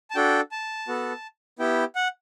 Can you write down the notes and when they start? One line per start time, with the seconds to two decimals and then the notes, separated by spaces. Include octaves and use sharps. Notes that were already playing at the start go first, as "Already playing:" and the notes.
0.11 A5
0.15 D4 F#4 A4 G5
0.51 A5
0.88 B3 F#4 A4
1.59 B3 E4 G4 G5
1.95 F#5